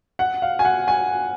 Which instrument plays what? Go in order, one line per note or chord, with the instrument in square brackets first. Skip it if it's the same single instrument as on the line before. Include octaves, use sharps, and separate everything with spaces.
[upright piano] F#5
F5
G#5
F#5
G#5